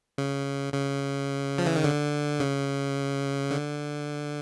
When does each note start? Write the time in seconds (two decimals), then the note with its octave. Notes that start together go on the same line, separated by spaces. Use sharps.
0.18 C#3
0.74 C#3
1.58 F3
1.66 E3
1.76 D#3
1.84 D3
2.40 C#3
3.51 D3